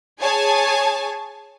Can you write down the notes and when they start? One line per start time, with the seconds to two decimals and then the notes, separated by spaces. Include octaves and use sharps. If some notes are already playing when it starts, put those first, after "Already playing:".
0.20 G#4 C#5 G#5 A5